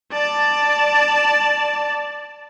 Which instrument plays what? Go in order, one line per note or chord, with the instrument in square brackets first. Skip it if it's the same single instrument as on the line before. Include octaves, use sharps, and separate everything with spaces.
[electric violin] D5 A5